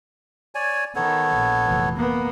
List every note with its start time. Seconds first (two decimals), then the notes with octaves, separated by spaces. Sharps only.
0.55 C#5 D5 G#5
0.96 D#3 B3 A4 C#5
1.36 A#1
1.65 F1 E3
1.97 A#3 B3